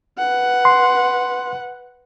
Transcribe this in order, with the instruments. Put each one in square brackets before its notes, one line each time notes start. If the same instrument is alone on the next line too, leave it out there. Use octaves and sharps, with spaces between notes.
[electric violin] B4 F#5
[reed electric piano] C6